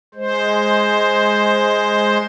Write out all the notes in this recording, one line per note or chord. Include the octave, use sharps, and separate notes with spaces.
G#3 C5